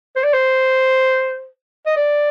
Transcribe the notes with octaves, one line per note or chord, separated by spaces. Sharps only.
C5
D5
C5
D#5
D5